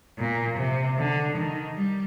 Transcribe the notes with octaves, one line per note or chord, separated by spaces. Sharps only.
A#2
C3
D3
D#3
G3